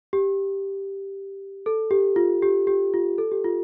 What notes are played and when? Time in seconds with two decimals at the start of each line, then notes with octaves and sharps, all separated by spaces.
0.13 G4
1.66 A4
1.91 G4
2.16 F4
2.43 G4
2.67 G4
2.94 F4
3.18 A4
3.32 G4
3.44 F4